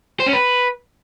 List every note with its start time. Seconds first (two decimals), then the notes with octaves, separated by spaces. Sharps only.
0.20 C5
0.26 C#4
0.33 B4